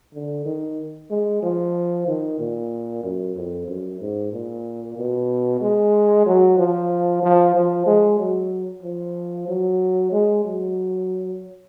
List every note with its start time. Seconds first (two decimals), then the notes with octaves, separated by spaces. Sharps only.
0.14 D3
0.46 D#3
1.10 G#3
1.43 F3
2.07 D#3
2.39 A#2
3.03 F#2
3.36 F2
3.68 F#2
4.00 G#2
4.33 A#2
4.98 B2
5.61 G#3
6.26 F#3
6.58 F3
7.23 F3
7.55 F3
7.86 G#3
8.19 F#3
8.83 F3
9.48 F#3
10.12 G#3
10.45 F#3